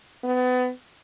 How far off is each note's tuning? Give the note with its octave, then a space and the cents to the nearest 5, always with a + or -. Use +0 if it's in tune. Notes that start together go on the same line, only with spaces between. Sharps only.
B3 +30